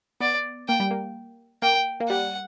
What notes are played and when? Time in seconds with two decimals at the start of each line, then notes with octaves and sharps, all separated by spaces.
0.21 B3 D5
0.68 A#3 G5
0.80 G3
0.91 A#3
1.62 A#3 G5
2.00 A#3
2.09 G3 F#5